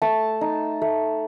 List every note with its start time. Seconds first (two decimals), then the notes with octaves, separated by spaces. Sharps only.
0.02 A3 A5
0.41 D#4
0.82 A3